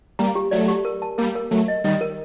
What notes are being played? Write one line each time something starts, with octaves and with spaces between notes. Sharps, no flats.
G3 A#3 A#5
G4
F#3 A3 D5
G4
A#4
A5
G3 A#3 A#4
A#4
F#3 A3 A#4
D#5
D#3 G3 D#5
A#4